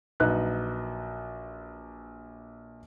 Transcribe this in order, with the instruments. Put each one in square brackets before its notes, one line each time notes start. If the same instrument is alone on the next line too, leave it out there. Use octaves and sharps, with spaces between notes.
[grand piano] A#1 F#3 D#4 B4 F#6